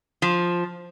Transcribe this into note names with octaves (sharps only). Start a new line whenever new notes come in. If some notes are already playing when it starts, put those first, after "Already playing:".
F3